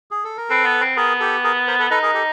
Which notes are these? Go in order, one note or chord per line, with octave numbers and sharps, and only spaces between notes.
G#4
A4
A#4
C4 A4 B4
B3
C4
B3 G#4 A#4
G4 A4
G#4 A#4
A#4 C5
A4 B4
D#4 A4 B4
G#4 A#4
G4 A4